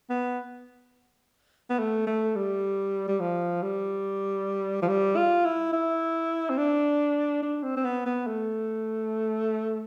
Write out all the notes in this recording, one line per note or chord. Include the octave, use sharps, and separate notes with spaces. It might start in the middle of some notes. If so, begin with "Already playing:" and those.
B3
B3
A3
A3
G3
G3
F3
G3
F3
G3
F4
E4
E4
C4
D4
D4
C4
C4
B3
B3
A3